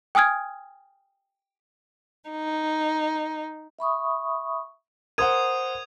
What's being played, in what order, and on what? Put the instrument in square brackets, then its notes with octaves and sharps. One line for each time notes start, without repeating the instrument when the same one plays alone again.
[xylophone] G5 G#5 D#6 F6 G#6
[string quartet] D#4
[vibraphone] E5 B5 C#6 D#6
[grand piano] A#4 C5 F#5 [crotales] D#6 G#6 D#7